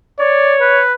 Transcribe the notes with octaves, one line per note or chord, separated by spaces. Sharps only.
C#5 D5
B4